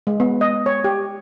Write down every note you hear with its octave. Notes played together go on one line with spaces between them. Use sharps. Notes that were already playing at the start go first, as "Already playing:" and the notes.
G#3
B3
D#5
C#5
G4